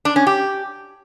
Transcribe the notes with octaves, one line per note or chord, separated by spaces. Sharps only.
D4
C#4
G4